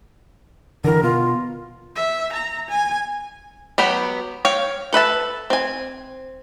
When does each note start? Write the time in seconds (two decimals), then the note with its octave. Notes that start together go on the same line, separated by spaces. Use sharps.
0.84 D3 E3 A#4
1.03 B2 F4
1.96 E5
2.33 A#5
2.69 G#5
3.78 F#3 B3 G4 B5
4.45 C#5 F5 G5
4.93 A4 B4 E5 A5
5.50 C4 G#5